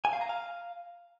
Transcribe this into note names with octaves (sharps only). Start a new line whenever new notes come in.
G#5
F5
A#5
F5